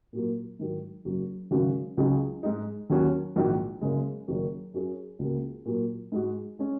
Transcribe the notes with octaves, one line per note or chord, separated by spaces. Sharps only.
A#2 F#3 A#3
G#2 D#3 F#3
F#1 F#2 F#3
G#1 F#2 C#3 G#3 F#4
C#2 C#3 F#3 D#4 G#4
G#2 G#3 D#4
D#2 D#3 F#3 C#4 F#4
A#1 G#2 D#3 A#3 F#4
F#1 F#2 C#3 G#3
F#1 F#2 D#3 F#3
F#2 F#3 C#4 G#4
C#2 C#3 A#3 F#4
A#2 F#3 A#3
G#2 G#3 F#4
G#3 C#4